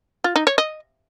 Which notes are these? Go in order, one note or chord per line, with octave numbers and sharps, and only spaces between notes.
F4
D#4
C#5
D#5